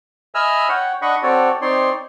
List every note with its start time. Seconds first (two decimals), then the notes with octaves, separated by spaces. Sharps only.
0.35 D#5 E5 G#5 B5 E6 F6
0.69 C#5 F#5 G5
1.02 D4 D#5 F#5 B5 C#6
1.23 C4 F#4 A4 C#5 D5
1.62 C4 D#4 C#5 D5 C6